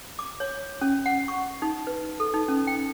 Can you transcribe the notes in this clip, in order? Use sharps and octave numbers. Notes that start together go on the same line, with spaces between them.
D6
C#5
C#4
F#5
C#6
D#4
B4
A4
D#4
C#4
G5